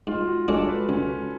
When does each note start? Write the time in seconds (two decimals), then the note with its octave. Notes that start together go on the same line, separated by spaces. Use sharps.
0.07 G#2 F4
0.27 F#4
0.48 G#3 D4 G#4 A4 C#5
0.69 B4
0.89 C#2 C#4